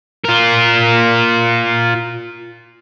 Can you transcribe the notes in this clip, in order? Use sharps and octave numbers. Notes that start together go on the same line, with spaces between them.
F4 A#4